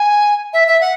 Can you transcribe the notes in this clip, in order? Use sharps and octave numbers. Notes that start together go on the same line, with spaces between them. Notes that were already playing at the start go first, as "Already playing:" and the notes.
Already playing: G#5
E5
E5
F#5